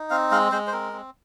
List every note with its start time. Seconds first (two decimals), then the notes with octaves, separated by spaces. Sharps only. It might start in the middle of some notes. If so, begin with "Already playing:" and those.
Already playing: D#4
0.10 C4 F5
0.31 G#3 F5
0.52 G#3 C5
0.67 C5
0.72 C4 A#4
0.93 C4